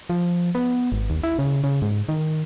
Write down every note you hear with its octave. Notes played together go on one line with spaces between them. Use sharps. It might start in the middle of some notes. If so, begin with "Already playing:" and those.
F3
B3
G#1
D#2
E4
C#3
C#3
G#2
D#3